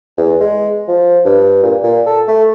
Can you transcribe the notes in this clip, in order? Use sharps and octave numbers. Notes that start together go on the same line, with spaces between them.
E2
G#3
F3
G2
A#2
A#2
A4
A3